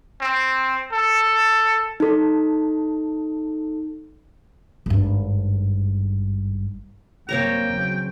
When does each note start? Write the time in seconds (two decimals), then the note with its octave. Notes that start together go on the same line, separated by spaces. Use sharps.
0.21 C4
0.93 A4
2.00 D#4 A4
4.86 G#1 G2
7.29 F#2 C3 G3 A#3 C4 C#5 G5 A#5
7.68 E2 C#3 F#3